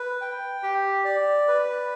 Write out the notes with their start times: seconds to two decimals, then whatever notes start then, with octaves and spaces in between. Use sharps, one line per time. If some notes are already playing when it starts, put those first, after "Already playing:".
Already playing: B4
0.21 G5
0.63 G4
1.05 D5
1.48 B4